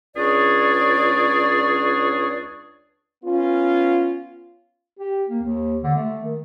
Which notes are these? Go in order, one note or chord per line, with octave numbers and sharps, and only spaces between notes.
C#2 D4 G#4 C#5 D5
B3 C#4 F4
G4
A#3
D#2
D3
A3
D#3